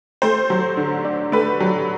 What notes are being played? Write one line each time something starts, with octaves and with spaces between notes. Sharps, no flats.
A3 C5
F#3
D3
D4
A3 B4
F#3